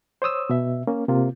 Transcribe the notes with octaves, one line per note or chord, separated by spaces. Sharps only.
C5 C#5 D#6 E6
B2 E5
A#3 C#4
C3 A#3 F4